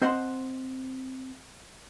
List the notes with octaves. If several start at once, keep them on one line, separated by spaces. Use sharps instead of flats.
C4 C5 D#5 F#5 A5 C6